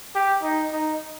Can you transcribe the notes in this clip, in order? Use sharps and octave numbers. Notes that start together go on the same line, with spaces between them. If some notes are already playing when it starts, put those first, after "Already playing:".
G4
D#4
D#4